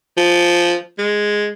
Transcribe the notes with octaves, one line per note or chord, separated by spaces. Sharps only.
F3
G#3